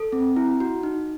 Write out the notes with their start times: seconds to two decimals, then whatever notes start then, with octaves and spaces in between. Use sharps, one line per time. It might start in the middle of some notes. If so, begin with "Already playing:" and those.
Already playing: A4
0.12 C4
0.36 E4
0.60 F#4
0.83 D#4